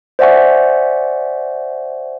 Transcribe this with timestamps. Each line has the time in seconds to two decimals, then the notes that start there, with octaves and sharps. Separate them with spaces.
0.19 C5 D5 E5 F#5 G#5 C#6